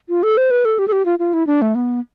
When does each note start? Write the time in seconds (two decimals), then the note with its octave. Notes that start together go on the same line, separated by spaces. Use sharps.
0.09 F4
0.23 A4
0.37 C5
0.51 B4
0.65 A4
0.79 G4
0.88 A4
0.92 G4
1.06 F4
1.19 F4
1.33 E4
1.47 D4
1.62 A3
1.75 B3